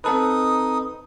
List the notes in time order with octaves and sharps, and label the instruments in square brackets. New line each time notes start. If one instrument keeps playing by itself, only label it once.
[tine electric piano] C4 A4 B4 [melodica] D#4 D#6